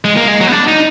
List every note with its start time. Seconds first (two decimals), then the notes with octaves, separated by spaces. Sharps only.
0.05 G#3
0.16 A#3
0.28 G#3
0.41 F#3
0.47 B3
0.52 D4
0.68 D#4